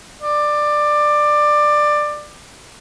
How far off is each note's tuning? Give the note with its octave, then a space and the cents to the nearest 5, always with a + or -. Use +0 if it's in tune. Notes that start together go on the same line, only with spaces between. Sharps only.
D5 +15